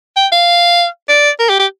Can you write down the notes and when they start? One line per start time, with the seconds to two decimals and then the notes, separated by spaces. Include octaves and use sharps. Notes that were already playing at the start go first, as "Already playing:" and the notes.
0.16 G5
0.32 F5
1.09 D5
1.40 A#4
1.49 G4
1.59 G4